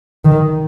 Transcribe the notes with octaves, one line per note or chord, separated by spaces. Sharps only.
D#3